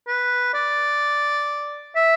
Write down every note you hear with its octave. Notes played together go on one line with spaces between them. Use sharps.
B4
D5
E5